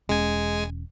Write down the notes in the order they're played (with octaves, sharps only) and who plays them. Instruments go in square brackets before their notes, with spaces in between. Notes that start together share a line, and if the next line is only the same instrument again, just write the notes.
[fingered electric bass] E1 C#4 [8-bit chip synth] G#3 G#5